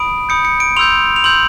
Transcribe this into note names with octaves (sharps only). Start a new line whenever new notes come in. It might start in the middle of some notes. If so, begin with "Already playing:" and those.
Already playing: B5 D#6 D7
B5 D#6 G6 C#7
C#7
D7
C6 E6 G6 F7
F7
C6 E6 G6 F#7